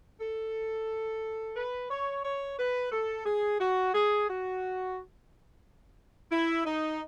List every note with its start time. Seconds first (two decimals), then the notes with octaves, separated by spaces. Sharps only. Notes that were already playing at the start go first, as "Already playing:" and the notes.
0.20 A4
1.55 B4
1.90 C#5
2.23 C#5
2.58 B4
2.91 A4
3.25 G#4
3.59 F#4
3.93 G#4
4.28 F#4
6.31 E4
6.65 D#4